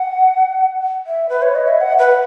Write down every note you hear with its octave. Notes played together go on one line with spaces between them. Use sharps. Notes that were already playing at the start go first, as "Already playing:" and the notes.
Already playing: F#5
E5
B4
C#5
D#5
E5
F#5
B4